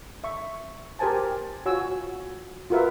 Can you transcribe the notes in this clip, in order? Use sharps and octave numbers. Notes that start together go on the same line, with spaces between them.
E5 C#6
G4 A#4 C5 G#5 A5
F4 F#4 C#5 G#5 E6
F4 F#4 A#4 B4 E5